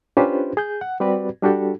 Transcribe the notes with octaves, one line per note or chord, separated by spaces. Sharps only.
C#4 D4 F4 G4 B4 C5
G#4 G6
F#5
G3 C4 F#4 G4 B4 D5
G3 D4 F#4 G4 A4